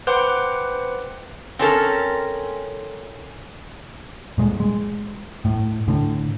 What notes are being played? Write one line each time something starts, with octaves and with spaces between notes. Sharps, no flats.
B4 C5 F#5 G5 C6 D6
C4 C#4 A4 A#4
A#2 G#3
G#3
A2
A2 D3